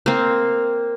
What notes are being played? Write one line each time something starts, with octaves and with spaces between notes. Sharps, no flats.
A#3 C4